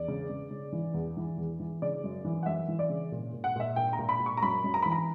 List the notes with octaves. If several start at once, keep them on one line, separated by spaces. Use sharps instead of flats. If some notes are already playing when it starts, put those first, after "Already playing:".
Already playing: E2 D5
C#3
C#3
C#3
E3
E2
E3
E2
E3
C#3 D5
F#2
E3
F#5
F#2 E5
E3
D5
C#3
A#2
A#2
F#5
A#2 E5
A#2 G5
A#5
A#2
B5
A#2
C#6
A#5
F#2 B5
F#2
A#5
E3 B5
A#5